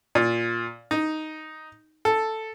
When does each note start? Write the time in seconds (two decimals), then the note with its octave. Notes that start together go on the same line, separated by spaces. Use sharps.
0.15 A#2
0.91 D#4
2.05 A4